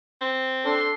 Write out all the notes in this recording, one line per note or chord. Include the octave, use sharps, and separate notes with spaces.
C4
D4 A4 C6